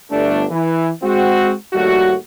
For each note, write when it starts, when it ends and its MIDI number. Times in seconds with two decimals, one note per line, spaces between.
0.11 0.44 31
0.11 0.44 57
0.11 0.44 62
0.50 0.88 52
1.02 1.52 56
1.02 1.52 60
1.02 1.52 66
1.73 2.14 39
1.73 2.14 45
1.73 2.14 55
1.73 2.14 57
1.73 2.14 66